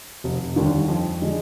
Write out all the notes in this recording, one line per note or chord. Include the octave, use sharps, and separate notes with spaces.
F1
D#2 D3 G3
F2
D3 G#3 D4 G4